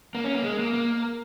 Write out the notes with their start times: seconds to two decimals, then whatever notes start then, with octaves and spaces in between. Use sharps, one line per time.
0.15 A#3
0.24 C#4
0.34 A#3
0.44 G#3
0.59 A#3
0.73 A#3